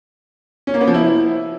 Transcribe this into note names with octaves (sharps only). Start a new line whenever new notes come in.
C#4
A#3
B3
F3
E4